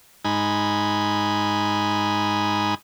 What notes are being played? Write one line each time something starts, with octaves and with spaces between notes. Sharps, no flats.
G#2 D#4 G#5 B5